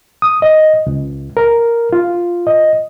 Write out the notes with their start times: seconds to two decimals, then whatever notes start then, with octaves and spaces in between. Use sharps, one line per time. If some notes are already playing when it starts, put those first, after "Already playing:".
0.22 D#6
0.42 D#5
0.86 C#2
1.37 A#4
1.93 F4
2.47 D#5